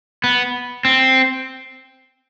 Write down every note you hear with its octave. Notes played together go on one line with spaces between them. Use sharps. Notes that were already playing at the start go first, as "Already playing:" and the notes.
B3
C4